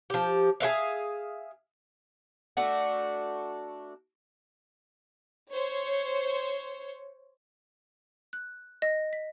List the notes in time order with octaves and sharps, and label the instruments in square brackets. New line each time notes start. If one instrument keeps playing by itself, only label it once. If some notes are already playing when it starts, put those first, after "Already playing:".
[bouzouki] F3 G4
G#4 B4 E5 F5
A3 D4 F#4
[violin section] C5 C#5
[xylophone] F#6
D#5
B6